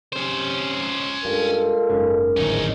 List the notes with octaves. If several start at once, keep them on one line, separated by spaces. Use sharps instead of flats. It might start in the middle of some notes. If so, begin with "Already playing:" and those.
C3 C#4 C5
G2 G#3 F4 A4 A#4
F#1 G#2 C#3
D1 G#1 E2 G#2 E3 F3 C#4 D#4